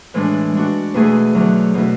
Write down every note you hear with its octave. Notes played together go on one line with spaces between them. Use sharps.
A2 E3 G#3 D4
G#3 D4 F#4
E2 B2 A3 E4 G#4
E2 D3 F#3
B2 A3 E4